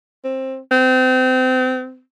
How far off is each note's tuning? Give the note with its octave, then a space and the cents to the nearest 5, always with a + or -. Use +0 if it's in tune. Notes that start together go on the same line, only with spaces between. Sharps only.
C4 +15
C4 -30